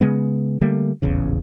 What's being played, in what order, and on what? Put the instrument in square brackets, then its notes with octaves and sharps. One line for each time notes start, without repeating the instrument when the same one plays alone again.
[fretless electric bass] C#3 G#3 B3
D3 G3 A3 A#3
D#1 A1 E2 C#3